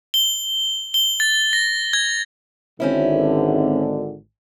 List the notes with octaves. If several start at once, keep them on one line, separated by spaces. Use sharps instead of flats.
G7
G7
A6
A#6
G#6
G#1 D3 C4 C#4 E4